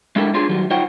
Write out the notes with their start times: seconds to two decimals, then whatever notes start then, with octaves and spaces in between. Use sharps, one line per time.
0.16 G#3 D4 E4 G4 A4 A#4
0.34 D4 F4 G#4 C#5 C6
0.49 D#3 F#3 G3
0.70 D#4 F4 C5 C#5 F#5 G5